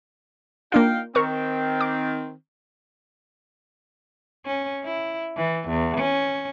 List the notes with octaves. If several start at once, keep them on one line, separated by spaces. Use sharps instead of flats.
A#3 D4 D#4 F4 F5 G5
D#3 C4 A#4 C#6
D6
C#4
E4
E3
E2
C#4